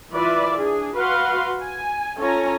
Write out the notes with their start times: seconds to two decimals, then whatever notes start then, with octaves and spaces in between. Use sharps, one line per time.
0.12 E3 F4 B4 D5 E5
0.57 D4 G#4
0.95 F#4 B4 F5 F#5 C6
1.61 G#5
2.18 C#4 F4 A4 C#5 G#5 A#5